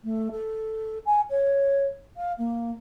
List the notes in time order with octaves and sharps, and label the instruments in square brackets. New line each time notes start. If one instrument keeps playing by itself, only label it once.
[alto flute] A3
A4
G#5
C#5
F5
A#3